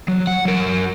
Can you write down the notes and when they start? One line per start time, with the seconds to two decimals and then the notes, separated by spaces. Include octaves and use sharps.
0.08 F#3
0.27 F#5
0.45 F#3 A#4